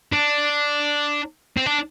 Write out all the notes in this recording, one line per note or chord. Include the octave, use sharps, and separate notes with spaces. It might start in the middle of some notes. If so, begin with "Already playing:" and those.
D4
C4
D4